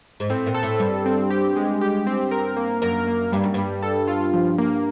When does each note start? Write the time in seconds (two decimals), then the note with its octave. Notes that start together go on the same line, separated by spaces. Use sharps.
0.20 G#2
0.30 A2 C4
0.46 A#2
0.54 A4
0.63 A2
0.80 G2 G3
1.06 C4
1.30 G4
1.56 G#3
1.81 G4
2.07 C4
2.31 A#4
2.57 A#3
2.82 F#2 A#4
3.07 A#3
3.32 G2 G3
3.44 F#2
3.54 G2 G3
3.83 A4
4.08 F4
4.34 F3
4.58 A#3